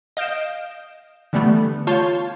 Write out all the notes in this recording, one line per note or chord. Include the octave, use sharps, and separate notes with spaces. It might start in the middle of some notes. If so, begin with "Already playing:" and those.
D#5 F5 G6 D7 E7
D3 E3 G3 A3 B3
F4 C#5 A5 G6